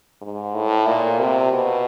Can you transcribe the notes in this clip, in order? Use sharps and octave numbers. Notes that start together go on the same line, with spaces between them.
G#2
A2
A#2
C3
B2